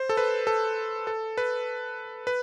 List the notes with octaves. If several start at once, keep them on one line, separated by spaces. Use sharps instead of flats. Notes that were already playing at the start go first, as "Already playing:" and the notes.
Already playing: C5
A4
B4
A4
A4
B4
B4